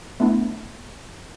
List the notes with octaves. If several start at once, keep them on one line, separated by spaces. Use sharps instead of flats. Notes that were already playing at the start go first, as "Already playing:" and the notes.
A3 B3 D4 E4